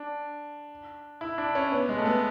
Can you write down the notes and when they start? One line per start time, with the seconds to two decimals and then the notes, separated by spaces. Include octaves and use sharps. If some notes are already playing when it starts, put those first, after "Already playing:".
Already playing: D4
1.21 E4
1.38 D4
1.55 C#4
1.72 B3
1.89 G#3
1.98 A3
2.06 B3